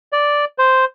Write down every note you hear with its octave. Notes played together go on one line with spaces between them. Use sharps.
D5
C5